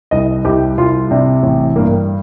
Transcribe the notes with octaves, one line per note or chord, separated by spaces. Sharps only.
C2 D#5
C2 G4
C2 F4
C3 D4
A1
G2 A#3